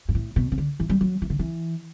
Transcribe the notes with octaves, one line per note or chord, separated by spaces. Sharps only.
G2
A2
B2
C#3
D3
E3
G3
F#3
E3
D3
E3